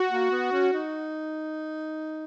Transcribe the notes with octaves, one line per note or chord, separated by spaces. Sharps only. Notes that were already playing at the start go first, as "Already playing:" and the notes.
Already playing: F#4
A#3
B3
C#4
D#4